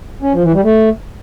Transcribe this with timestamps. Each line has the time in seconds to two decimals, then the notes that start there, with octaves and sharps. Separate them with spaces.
0.22 C#4
0.33 F3
0.43 E3
0.54 G3
0.64 A3